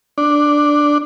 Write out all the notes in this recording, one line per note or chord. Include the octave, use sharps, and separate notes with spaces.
D4